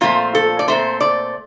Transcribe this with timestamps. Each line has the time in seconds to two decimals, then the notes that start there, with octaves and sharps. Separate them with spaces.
0.01 A#2 F3 A3 C4 F4
0.35 A4
0.59 D5
0.68 A#2 A3 C4 C5
1.01 D5